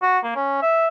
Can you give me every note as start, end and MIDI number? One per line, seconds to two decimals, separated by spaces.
0.02 0.18 66
0.23 0.32 58
0.36 0.58 61
0.62 0.88 76